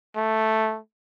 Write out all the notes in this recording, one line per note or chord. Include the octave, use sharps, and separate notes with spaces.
A3